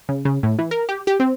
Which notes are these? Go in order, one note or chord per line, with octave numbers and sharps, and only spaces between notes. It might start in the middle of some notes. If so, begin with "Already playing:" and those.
C#3
C#3
A2
E3
A#4
G4
G4
C4